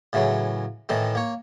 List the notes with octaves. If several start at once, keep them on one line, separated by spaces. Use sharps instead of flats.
A2 C#3 E3 F#3
A2 D#3 E3 A3
A#3 C#5